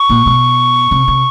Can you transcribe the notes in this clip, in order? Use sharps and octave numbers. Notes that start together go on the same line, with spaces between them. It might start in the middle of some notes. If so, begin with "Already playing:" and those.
Already playing: C#6
A#2
B2
C3
C3